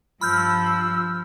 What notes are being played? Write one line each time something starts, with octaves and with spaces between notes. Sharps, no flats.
G2 F3 B5 E6 F6 G6